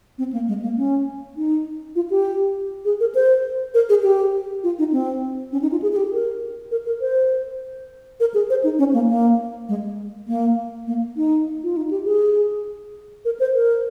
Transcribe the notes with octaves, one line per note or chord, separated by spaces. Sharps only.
C4
A#3
G#3
A#3
C#4
D#4
F4
G4
G#4
A#4
C5
A#4
G#4
G4
F4
D#4
C4
C#4
D#4
F4
G#4
G#4
G4
A#4
A#4
A#4
C5
A#4
G#4
C5
D#4
C#4
A#3
A#3
G#3
A#3
A#3
D#4
F4
D#4
G4
G#4
A#4
C5
A#4